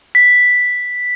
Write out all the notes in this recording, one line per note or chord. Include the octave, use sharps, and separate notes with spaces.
B6